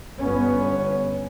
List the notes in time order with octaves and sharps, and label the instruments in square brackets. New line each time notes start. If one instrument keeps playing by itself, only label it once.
[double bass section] G1 B3 C#4